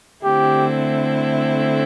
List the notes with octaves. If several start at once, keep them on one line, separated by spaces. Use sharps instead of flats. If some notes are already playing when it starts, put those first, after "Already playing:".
D3 A3 C4 E4 G4